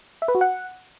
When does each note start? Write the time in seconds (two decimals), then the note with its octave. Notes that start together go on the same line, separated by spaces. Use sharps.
0.22 E5
0.28 B4
0.35 F#4
0.41 F#5